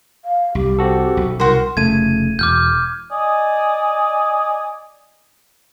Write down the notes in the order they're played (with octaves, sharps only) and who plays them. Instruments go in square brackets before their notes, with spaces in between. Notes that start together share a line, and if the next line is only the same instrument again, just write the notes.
[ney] F5
[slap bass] C2 [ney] G4
[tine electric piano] C4 F#4 A4
[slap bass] B1
[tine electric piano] C2 [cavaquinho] F#4 C5 [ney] A#4
[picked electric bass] F1 C#3 A3 [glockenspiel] G#6 D#7
[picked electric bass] E1 [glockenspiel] D6 F6 G6
[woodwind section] D5 D#5 G#5 D#6